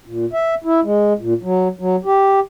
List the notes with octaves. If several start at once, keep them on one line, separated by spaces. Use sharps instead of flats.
A#2
E5
E4
G#3
A#2
F#3
F#3
G4